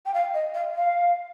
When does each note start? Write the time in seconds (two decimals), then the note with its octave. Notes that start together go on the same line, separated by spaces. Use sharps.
0.06 G5
0.14 F5
0.34 D#5
0.54 F5
0.75 F5